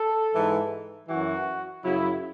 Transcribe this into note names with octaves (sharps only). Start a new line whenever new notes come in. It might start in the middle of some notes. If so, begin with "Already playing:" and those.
Already playing: A4
G#2 E3
F#2 E3 F#4
F#2 C#3 F#3 E4